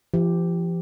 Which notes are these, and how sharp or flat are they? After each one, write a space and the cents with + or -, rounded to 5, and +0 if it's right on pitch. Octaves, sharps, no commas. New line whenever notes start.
F3 -40 G4 +0